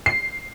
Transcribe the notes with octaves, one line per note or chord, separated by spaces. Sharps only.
C7